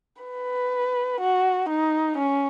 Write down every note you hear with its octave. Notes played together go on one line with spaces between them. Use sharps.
B4
F#4
D#4
C#4